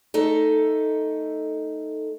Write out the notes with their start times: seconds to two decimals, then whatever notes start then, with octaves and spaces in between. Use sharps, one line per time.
0.14 A3 D#4 A4